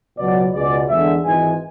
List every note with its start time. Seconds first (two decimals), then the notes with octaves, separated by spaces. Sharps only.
0.18 C#2 B2 F#3 D5
0.54 C#2 B2 G#3 D5
0.89 E2 D3 G#3 E5
1.25 G#1 G#2 E3 G#3 G#5